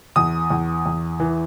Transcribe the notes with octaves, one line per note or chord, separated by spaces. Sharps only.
E2 D#6
E2
E2
E3